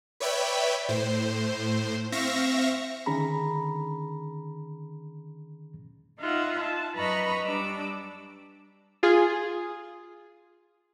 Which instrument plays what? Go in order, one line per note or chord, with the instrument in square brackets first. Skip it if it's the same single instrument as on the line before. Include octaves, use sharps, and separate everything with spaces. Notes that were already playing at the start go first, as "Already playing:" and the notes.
[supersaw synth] B4 C#5 D5 E5 G5 B5
A2 C5
C4 E5 F5 C#6 A#6
[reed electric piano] D3 D#3 C#4 G#4 A#5 B5
[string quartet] D#4 F4 E5 F#5
A5
F#2 B4 D#5 A#5 B5 C#6
G3 D4 D6 E6
[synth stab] F4 G#4